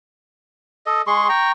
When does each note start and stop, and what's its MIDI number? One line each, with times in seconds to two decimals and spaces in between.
0.86 1.02 69
0.86 1.02 75
1.07 1.28 56
1.07 1.28 68
1.07 1.28 84
1.07 1.28 85
1.29 1.52 79
1.29 1.52 82
1.29 1.52 85